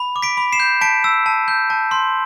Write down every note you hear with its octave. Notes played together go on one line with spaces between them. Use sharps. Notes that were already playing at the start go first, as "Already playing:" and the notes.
Already playing: B5
D6
B6 D7
B5
C7 E7
G6
A5 B6 D7
E6
A5
G6
A5
C6